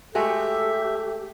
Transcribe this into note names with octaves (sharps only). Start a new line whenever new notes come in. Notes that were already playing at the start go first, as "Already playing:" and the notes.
G#3 A3 F#4 G4 A4 E5